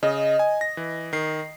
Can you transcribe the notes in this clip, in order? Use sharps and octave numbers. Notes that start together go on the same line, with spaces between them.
C#3 D#5
G#5
A#6
E3
D#3 C7